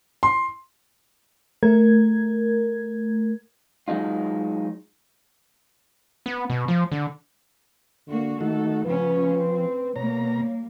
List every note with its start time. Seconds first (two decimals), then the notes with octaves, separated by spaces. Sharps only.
0.23 C6
1.63 A3 A#4 G#6
3.88 F#3 G#3 D#4 F4
6.26 B3
6.50 B2
6.68 F3
6.92 D3
8.08 D3 A#3 F#4
8.41 D#3 A3 D#4 F#4 A4
8.85 C#3 F3 B3 C#4 B4
9.27 C4
9.96 B2 G3 A#3 C#5 A#5